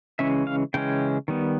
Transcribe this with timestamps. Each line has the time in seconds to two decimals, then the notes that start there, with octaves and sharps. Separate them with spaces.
0.19 C#3 E3 G#3 C#4 E5
0.47 F5
0.74 C#3 E3 G#3 C#4 G5
1.28 D#3 G3 B3